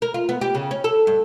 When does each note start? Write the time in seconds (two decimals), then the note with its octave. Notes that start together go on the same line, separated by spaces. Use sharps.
0.02 A#4
0.14 F4
0.29 B3
0.41 G4
0.55 C#3
0.71 C#4
0.84 A4
1.07 G2